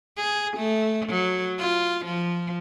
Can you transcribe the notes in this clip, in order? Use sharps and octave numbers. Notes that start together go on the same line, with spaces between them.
G#4
A3
F#3
F4
F3